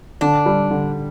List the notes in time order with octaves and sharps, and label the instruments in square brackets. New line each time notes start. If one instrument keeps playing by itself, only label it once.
[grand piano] D3 [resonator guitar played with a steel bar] D4
[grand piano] G3
D3